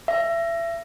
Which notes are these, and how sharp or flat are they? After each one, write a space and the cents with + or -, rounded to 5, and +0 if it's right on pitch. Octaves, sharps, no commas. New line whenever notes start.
E5 +30